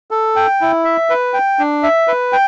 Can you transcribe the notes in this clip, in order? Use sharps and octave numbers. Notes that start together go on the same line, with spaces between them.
A4
G5
E4
E5
B4
G5
D4
E5
B4
G5